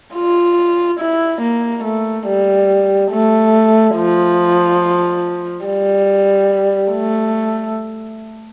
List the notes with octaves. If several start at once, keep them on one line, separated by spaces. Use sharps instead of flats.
F4
E4
A#3
A3
G3
A3
F3
G3
A3